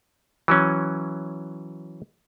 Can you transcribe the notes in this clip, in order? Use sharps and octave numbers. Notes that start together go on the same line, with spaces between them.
E3 F#3 C#4